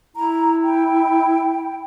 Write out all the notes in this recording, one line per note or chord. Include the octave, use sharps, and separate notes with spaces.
E4 A#5
G5